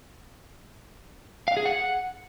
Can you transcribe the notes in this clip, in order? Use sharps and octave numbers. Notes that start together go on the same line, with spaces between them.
F5
G#4
F#5